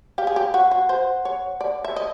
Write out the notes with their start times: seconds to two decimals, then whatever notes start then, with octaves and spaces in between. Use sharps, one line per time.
0.18 G4 F5
0.27 G#4
0.36 G4
0.54 F#4 F#5
0.71 F#4
0.89 C5
1.25 C#5
1.61 D5
1.84 E5
1.96 D#5